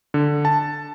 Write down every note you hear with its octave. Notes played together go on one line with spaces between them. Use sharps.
D3
A5